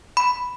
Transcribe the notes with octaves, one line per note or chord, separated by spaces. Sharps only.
B5